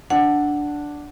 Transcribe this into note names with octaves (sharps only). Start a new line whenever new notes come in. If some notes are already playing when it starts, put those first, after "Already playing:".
D4 F#5